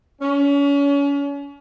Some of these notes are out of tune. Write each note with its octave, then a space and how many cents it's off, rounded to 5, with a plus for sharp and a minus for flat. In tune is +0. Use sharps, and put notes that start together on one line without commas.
C#4 +35